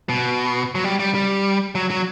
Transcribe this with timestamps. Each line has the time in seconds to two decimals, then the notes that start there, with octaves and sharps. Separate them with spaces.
0.09 B2
0.75 F#3
0.84 G3
0.99 G3
1.15 G3
1.75 F#3
1.90 F#3